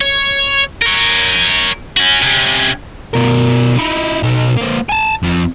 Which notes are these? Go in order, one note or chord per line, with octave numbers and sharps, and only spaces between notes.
C#5
A#4 C#5
C#4 F#4
C3 C#4
B2 A#4
D#4 E4
B2 D#4
A#3 C4
G#5 A5
F2 F3